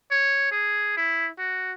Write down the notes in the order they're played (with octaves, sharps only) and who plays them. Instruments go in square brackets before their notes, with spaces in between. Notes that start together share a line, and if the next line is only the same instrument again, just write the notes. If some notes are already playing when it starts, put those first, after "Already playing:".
[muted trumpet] C#5
G#4
E4
F#4